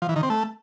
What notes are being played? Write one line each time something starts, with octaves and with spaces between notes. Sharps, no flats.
F3
E3
D#3
C4
A3